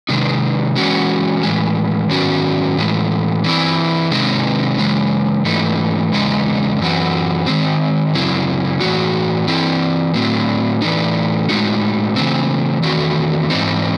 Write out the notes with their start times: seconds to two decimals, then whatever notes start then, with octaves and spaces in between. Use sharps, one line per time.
0.09 C3 D#3 G#3 D#4
0.76 E3 G#3 C#4 F#4
1.43 A2 E3 G#3
2.10 G#2 D#3 F#3 C#4 F#4
2.77 A2 E3 G#3
3.44 E3 C4 E4
4.11 C3 D#3 G#3 C4 D#4
4.78 C#3 E3 G#3
5.45 G#2 E3 A3 D#4
6.12 E2 C#3 G#3 D#4
6.79 F#2 E3 C4 F#4
7.46 D#3 G#3 C4
8.14 F#2 C#3 F#3 C4 E4
8.80 A2 E3 C4 F#4
9.48 E3 C4 E4
10.14 A2 F#3 C4
10.82 A2 E3 A3 D#4
11.49 A2 G#3 D#4 F#4
12.16 C#3 E3 A3 C4
12.83 E2 D#3 A3 C4 F#4
13.50 G#2 E3 C4 D#4